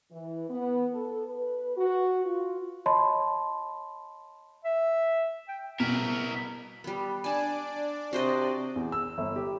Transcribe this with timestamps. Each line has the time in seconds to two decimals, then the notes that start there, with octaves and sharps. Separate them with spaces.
0.11 E3
0.49 B3
0.92 A4
1.27 B4
1.77 F#4
2.25 F4
2.86 C#5 D#5 A5 B5 C6
4.65 E5
5.48 G5
5.80 B2 E4 A#4
6.84 G3 B3
7.24 D4 D5 G#5 A5
8.13 C3 F#4 C5 D#5
8.76 E2
8.92 E6
9.18 G1
9.36 G4